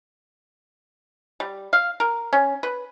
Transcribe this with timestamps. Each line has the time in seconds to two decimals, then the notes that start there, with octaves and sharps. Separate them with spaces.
1.40 G3
1.73 F5
2.00 A#4
2.33 C#4
2.63 B4